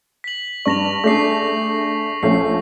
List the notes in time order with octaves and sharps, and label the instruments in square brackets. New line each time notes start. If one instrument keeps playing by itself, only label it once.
[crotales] B6 F#7
[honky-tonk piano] G2 D5 [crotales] C#6 A#6 F7
[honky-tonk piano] A3 D4 G#4 [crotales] C#6 C7
[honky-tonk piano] A#1 A3 C#4 [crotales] C7